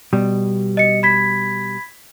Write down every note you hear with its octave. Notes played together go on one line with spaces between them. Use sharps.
B2 G3
D#5 C#7
B5 G#6 B6